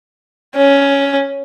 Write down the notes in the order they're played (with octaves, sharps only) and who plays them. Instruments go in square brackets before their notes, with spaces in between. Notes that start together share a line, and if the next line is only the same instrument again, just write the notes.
[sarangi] C#4